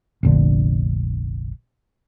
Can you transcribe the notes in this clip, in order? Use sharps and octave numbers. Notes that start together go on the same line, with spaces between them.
F1 A#1 D3